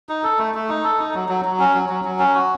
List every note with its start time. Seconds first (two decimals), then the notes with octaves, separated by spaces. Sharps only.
0.09 D#4
0.24 A4
0.39 A3
0.55 A3
0.69 D#4
0.84 A4
0.99 D#4
1.15 F#3
1.29 F#3
1.45 F#3
1.60 C#4
1.74 F#3
1.89 F#3
2.05 F#3
2.19 C#4
2.35 F#4